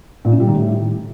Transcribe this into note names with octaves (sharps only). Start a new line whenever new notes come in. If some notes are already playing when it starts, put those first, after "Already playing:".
A#2
C#3
G3
D#3
A2